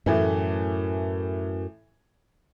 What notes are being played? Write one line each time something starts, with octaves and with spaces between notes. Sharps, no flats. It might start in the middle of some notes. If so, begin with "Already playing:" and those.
F#2 A2 E3 A3